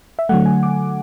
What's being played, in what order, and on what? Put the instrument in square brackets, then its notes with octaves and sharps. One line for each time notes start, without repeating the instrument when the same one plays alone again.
[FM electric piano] E5
D3 F#3 A3 F#5
G#5
D6